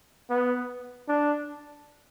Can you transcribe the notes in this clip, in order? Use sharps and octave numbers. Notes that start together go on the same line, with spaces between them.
B3
D4